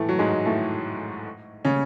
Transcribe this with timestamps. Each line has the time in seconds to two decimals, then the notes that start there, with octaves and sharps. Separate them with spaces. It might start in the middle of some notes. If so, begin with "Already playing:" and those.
Already playing: A2 E3 A3
0.09 F#3
0.19 G#2 G#3
0.45 A2 A3
1.65 C#3 C#4